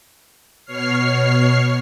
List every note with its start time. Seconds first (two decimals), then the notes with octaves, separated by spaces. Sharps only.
0.65 B2 C#5 F6 C7